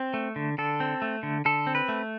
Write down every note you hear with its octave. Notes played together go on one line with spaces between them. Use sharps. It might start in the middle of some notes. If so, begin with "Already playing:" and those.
Already playing: C4
A3
D3
D3 A4
C4
A3
D3
D3 A4
C4
B4
A3